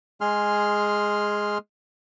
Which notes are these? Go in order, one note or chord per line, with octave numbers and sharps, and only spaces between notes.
G#3 G#4 C6 F6